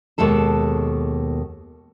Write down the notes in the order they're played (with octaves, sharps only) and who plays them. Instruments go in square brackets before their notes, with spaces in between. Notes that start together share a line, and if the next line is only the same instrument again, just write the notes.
[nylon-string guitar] D#2 B2 G#3 A4 A5